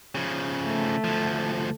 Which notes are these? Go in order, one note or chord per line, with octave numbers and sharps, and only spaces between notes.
C#3 F3
A3
D2 F3